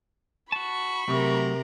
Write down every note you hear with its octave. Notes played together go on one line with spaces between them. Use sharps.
F#4 A5 B5 C#6
C3 F#3 A3 A#4